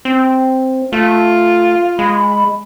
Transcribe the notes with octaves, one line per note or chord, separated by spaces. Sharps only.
C4
A3 F4
G#3 B5